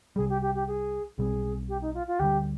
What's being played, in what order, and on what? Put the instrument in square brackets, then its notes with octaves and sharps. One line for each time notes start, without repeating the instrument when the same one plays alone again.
[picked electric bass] C2 C3 G3 [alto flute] G#4
[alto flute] G4
G4
G4
G#4
[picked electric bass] B1 B2 G3 C4 [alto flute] G#4
[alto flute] G4
D#4
F4
F4
[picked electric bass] D2 D3 G3 [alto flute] G4